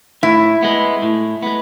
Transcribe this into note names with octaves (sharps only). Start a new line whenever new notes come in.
A2 E4
G#3 B3
A2
G#3 B3